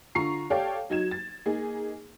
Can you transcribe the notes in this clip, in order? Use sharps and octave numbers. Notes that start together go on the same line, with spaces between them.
D3 F4 A#5 C#6 C7
G4 A4 C#5 D5 F5 G5
F#3 D#4 G#6 E7
A6
A#3 D#4 G#4